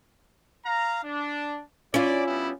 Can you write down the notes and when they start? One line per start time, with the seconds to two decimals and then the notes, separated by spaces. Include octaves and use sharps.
0.65 F5 A#5
1.03 D4
1.94 C#4 E4 F4 D5
2.26 G3 B3 E4